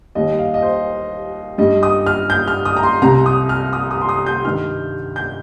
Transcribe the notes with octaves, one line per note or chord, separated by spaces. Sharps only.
D#2 D#3 G3 D#5
F5
D#5
C5
G2 G3 D#5
D#6
F6
G6
F6
D#6
A#5
C6
C2 C3 G3 A#5
D#6
F6
D#6
D#6
C6
D#6
G6
G2 D#3 G3 F6
G6